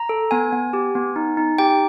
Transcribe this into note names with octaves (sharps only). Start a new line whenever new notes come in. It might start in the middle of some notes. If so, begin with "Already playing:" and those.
Already playing: A#5
A4
B3 G#5
B3
G4
B3
D#4
D#4
G4 G5